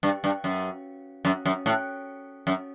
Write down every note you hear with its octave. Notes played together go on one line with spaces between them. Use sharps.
G2
G2
F#2
F#2
F#2
A2
F#2